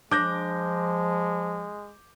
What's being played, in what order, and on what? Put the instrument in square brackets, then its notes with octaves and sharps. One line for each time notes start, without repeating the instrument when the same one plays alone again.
[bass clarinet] F3 [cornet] G#3 [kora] D4 [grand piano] D6 G6 A#6